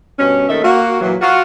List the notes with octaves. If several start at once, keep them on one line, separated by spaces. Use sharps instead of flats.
G2 B2 C#4
D#2 D#3 A3 D#5 E5
A#3 F#4
A#2 E3 F#3
F4 F#4